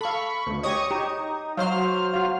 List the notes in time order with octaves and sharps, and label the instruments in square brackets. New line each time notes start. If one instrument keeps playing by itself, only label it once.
[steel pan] A4 F5 [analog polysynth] B5 C#6
[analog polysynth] D2
[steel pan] G4 C#5 D#5 [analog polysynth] C#6 D#6 G#6
[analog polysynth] D#4 [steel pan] G4
[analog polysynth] F#3 C5 F6 [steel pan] F5
[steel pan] F#4 F5